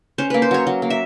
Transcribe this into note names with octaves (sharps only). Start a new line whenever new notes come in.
C#4 C5
A#3 B4
C5
F#3 C#5
F#3
A#3
E5